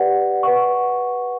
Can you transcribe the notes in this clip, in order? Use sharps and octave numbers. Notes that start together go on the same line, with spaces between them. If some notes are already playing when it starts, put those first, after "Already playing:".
Already playing: G4 B4 D5 F#5
B4 F#5 C#6